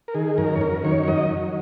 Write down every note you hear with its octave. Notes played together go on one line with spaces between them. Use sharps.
A#4
D#3 G#4
F#2 A#4
C#5
F#2 A#4
D#3 C#5
C#5
F#3 D#5
F#3